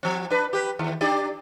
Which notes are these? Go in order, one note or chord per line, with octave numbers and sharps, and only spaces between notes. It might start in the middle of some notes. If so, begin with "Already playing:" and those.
F3 C4
D4 B4
G4 B4
D#2
D4 G4 D5